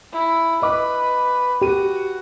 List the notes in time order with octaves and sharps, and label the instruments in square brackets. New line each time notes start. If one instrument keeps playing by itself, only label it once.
[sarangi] E4
[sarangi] B4 [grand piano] D#5 D6
[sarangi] F#4 [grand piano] G4 D#7